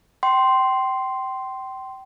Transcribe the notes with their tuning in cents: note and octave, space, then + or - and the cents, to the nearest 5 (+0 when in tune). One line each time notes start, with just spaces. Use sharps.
G5 -30 C6 +0